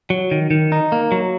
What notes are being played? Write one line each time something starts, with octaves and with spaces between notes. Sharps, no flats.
F#3
D#3
D#3
D#4
A#3
F#3